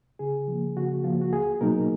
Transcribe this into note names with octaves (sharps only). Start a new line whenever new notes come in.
C#3 G#4
F3 A#3
C#3 F#4
F3 A#3 F4
F#4
C#2 G#4
B2 F#3 A#3 D#4 A#4